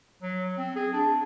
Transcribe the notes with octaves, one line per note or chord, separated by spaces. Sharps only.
F#3
C4
G#4
D4